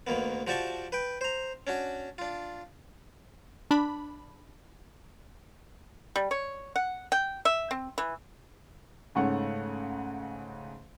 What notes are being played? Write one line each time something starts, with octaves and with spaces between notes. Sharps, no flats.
D2 D#3 A#3 B3
F3 F#4 G4 D5 A5 C#6
B4 G5
C5 A#5
C#4 D4 F#4
D4 F4
D4 B5
G3
C#5
F#5
G5
E5
C4
E3
G#2 C#3 A3 C#5 F#5